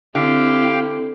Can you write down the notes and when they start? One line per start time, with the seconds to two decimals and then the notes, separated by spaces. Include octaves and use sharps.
0.15 D3 C4 E4 G4 F5 G5